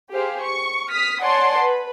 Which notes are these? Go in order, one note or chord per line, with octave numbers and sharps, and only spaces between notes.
G4 G#4 C5 F5
C#6
D#6 F6 B6
C#5 D5 F#5 G#5 A5 C6
B4